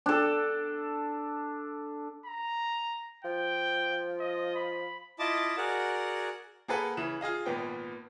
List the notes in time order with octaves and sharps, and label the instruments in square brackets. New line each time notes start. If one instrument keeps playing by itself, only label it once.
[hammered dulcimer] D4 A4
[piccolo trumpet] A#5
[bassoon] F3 [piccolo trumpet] G5
[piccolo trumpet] D#5
B5
[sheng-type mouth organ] E4 F4 D#5 A5 D6
F#4 G#4 A#4 D5 F#5
[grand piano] A#3 G#4 A4 B4 F#5
C#3 E3 E7 F#7
F4 G#4 D#5 F5
G#1 A#2 B3 G5